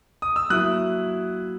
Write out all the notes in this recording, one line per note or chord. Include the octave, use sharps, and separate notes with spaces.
D#6
E6
F#3 A#3 E4 D#6 F#6